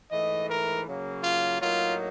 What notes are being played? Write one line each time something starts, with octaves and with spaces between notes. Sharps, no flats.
G#2 E3 A3 D#5
A#4
C#3 F#3 A#3
F4
A2 F#3 A#3 D#4 F4